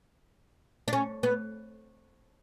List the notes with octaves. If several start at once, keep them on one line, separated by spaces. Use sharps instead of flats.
D4
C#4
B3